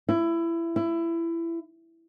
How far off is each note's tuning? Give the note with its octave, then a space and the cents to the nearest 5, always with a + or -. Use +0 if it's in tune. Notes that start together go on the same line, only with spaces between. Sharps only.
E4 +20
E4 +20